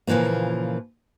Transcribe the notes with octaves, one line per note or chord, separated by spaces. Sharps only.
A#2 C#3 E3 F3 A#3